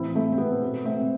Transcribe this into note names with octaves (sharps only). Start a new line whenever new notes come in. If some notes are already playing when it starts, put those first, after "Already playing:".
Already playing: A2 E3 C4 E4
A3 C4
C4
B3
B2 B3
A3 C4